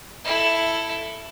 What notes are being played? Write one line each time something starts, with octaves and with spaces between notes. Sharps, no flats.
E4 A4